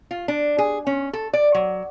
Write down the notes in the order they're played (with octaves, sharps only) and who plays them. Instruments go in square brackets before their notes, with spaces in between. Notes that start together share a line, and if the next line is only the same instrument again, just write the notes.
[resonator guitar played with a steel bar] F4
D4
G#4
C#4
A4
D5
F#3